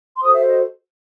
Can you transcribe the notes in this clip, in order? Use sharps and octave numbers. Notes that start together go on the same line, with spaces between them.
C6
F#4 A4 C5 D#6
E5
D#5